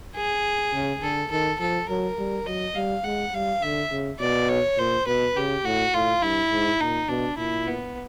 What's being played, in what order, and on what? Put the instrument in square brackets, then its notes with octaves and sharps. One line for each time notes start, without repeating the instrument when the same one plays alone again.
[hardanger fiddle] G#4
[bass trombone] C#3
[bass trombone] D3 [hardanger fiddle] A4
[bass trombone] D#3 [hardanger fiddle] A4
[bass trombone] F3 [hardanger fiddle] A4
[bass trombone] F#3 [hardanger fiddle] A#4
[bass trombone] G3
[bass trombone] F#3 [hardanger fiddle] D#5
[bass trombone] G3 [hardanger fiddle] F5
[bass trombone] G#3 [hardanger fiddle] F#5
[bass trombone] G3 [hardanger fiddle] F5
[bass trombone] D3 [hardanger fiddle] E5
[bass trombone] C#3
[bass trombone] B2 [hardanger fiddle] D5
[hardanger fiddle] C#5
[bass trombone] A#2 [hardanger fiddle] C5
[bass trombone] B2 [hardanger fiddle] B4
[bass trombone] C#3 [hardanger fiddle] G4
[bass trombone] A2 [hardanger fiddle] F#4
[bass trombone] A2 [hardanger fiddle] F4
[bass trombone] G2 [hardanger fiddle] E4
[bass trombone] G#2
[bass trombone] A#2 [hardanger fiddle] D#4
[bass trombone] B2 [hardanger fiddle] D4
[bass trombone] A#2 [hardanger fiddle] E4
[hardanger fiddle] B3